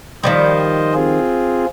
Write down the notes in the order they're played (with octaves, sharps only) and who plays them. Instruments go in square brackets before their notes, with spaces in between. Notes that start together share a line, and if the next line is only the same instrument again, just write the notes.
[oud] D#3 F3 G3 [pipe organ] C5 D#5
[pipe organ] C4 F4 G#4